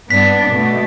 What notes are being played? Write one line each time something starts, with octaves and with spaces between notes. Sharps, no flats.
G2 B3 D4 B6
B2 A3